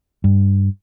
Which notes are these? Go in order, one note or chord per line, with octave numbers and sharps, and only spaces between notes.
G2